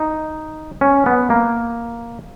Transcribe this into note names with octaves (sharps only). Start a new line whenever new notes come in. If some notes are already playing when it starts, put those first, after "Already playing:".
Already playing: D#4
C#4
B3
A#3